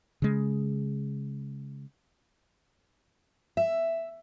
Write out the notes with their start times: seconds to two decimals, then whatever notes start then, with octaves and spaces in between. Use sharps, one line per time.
0.22 C#3 G#3
3.57 E5